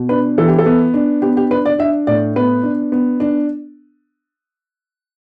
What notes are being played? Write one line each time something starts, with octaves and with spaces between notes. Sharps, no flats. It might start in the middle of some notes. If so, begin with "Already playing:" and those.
Already playing: B2
D4 B4
E3 A4
G4
A4
B3
D4
B3 G4
G4
D4 B4
D5
D4 E5
A2 D5
B3 B4
D4
B3
D4